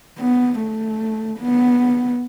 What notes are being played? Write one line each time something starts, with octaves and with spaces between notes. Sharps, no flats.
B3
A3
B3